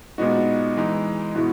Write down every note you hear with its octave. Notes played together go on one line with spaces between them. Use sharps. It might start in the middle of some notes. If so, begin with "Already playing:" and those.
A#2 G#3 B3 D#4 F#4
E3 G#3 D#4
B2 G#3 B3 E4 F#4